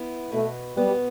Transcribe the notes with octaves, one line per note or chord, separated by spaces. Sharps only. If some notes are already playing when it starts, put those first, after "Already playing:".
Already playing: B3 E4
B2 A3
G3 B3